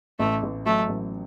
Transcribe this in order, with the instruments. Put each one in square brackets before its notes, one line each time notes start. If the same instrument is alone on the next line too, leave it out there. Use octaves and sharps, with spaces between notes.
[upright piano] A1 [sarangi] A3
[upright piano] A1
[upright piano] F#3 [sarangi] A3
[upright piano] A1